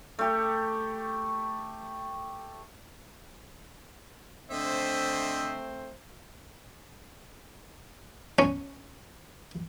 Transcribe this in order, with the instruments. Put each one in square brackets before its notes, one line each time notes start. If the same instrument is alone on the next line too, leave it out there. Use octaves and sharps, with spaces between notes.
[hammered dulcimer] A3 G4
[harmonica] D3 D#5 E5 [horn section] A3 C4 C5
[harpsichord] C#4